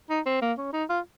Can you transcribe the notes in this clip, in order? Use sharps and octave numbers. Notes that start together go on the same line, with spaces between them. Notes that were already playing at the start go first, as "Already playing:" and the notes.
D#4
C4
A#3
C#4
D#4
F4